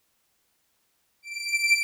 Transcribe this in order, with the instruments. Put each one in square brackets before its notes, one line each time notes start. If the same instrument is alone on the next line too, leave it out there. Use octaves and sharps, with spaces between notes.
[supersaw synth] D7